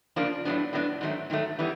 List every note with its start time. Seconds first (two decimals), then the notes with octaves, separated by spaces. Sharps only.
0.16 C#3 F3 A#3 D4
0.45 A2 F#3 B3 D4
0.73 A2 F#3 B3 D4
1.01 G#2 D#3 F#3 A3
1.30 G#2 D#3 F#3 A3
1.59 E3 G3 B3